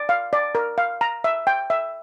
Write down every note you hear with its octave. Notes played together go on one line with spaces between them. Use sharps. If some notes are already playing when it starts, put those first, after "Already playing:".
Already playing: D5
F5
D5
A#4
F5
A#5
E5
G5
E5